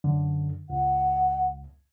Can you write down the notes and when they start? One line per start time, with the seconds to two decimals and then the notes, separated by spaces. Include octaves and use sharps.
0.04 F#2 D3
0.70 C#2 F#5